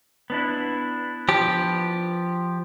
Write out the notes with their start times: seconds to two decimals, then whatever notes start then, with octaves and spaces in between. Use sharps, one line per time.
0.30 B3 D4 E4
1.29 F3 G4